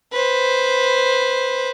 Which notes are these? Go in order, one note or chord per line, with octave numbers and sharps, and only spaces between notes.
B4 C5